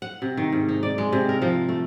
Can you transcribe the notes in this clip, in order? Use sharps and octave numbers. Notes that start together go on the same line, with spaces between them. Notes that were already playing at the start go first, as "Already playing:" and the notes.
F#5
C3
D#3
G#2
D#4
D5
G#3
C3
A#4
F3
A3